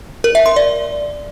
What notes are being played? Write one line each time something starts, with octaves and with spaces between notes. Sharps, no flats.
A#4
E5
C6
D5